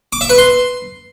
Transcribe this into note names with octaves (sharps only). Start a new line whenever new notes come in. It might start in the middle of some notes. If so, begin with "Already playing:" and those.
D6
E5
B4
C6